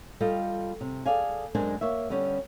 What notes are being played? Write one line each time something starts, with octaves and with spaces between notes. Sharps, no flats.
G3 F4 A4 D#5 F5 G5
C3
G#4 A4 D5 F5 G#5
F#2 G#3 D4 A#4 C5 G#5
A#3 C#5 E5
D3 G3 B3 C#4 G4